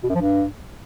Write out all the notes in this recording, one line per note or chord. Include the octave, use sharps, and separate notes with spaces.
B2
F#2
F3
G2